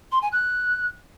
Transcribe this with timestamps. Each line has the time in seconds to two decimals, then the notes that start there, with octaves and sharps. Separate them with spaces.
0.12 C6
0.22 G#5
0.32 F#6